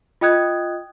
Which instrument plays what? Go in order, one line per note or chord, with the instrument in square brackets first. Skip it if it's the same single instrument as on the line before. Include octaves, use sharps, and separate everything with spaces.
[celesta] F4 D#5 G5 D#6 F#6 G#6